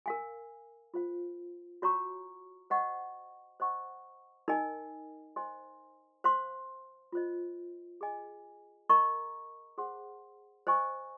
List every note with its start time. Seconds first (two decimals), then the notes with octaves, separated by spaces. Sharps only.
0.06 A#4 F5 G#5
0.94 F4 C5 F5
1.82 F#4 C#5 F5 A#5 C#6
2.70 C5 D#5 F#5 C#6
3.60 C5 D#5 F#5 C#6
4.48 D#4 A#4 D#5 G#5
5.36 C5 D#5 G#5 C6
6.24 C5 F5 C6
7.12 F4 C5 D#5
8.01 G#4 D#5 G#5
8.89 A#4 D#5 A#5 C#6
9.78 G#4 C5 F#5 C6
10.67 C5 D#5 G#5 C#6